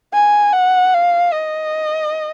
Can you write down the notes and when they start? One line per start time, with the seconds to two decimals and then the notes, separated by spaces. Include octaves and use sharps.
0.13 G#5
0.53 F#5
0.94 F5
1.33 D#5